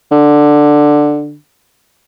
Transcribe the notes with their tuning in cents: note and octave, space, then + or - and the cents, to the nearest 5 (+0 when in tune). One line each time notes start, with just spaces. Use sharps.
D3 +10